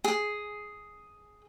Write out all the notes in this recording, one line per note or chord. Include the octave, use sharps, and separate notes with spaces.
G#4